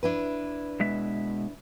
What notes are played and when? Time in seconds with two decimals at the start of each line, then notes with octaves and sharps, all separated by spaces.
0.03 D4 E4 B4
0.80 B2 G#3 E5